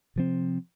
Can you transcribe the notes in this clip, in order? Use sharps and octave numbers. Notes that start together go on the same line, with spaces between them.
C3 F3 C4